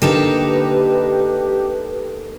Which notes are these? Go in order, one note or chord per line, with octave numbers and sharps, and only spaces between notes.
D3 A#3 D#4 G4 A4 B4 E7